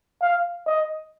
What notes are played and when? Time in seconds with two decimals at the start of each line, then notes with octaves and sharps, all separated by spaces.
0.22 F5
0.67 D#5